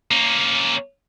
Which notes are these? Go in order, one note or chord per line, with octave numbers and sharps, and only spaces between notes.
A#3 C#4